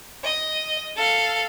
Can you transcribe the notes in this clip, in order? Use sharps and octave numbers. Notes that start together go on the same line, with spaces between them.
D#5
A4 F5